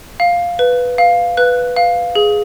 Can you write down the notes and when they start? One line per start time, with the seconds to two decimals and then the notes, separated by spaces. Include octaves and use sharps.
0.20 F5
0.59 B4
0.98 F5
1.37 B4 F#6
1.76 F5
2.15 G#4